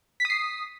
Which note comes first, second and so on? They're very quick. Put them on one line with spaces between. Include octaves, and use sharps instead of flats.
B6 D#6 C7